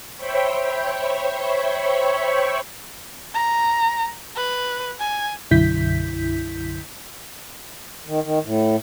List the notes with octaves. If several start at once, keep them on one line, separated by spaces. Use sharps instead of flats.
C5 C#5 E5 G5 B5 C#6
A#5
B4
G#5
B1 F#2 D3 E4 G6 B6
D#3
D#3
A2